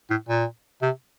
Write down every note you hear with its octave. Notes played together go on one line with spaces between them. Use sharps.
A2
A#2
C3